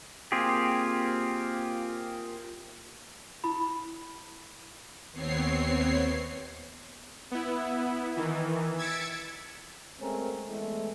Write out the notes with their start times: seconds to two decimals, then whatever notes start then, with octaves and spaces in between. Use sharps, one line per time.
0.32 A#3 C4 F4 G4 G#4
3.44 E4 B5
5.12 D#2 B3 C4 C#5 C7
7.31 B3 E4
8.16 D#3 E3
8.78 E6 G#6 A6 B6 C#7 D7
9.99 G#3 A3 C4 C#4 A#4
10.47 E2 G#3 A3